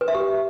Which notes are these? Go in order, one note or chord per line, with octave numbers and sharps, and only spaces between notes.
B4
E5
G4